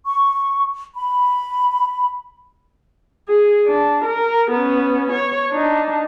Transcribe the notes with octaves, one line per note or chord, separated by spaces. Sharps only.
C#6
B5
G#4
D4
A#4
B3 C#4
C#5
D4 D#4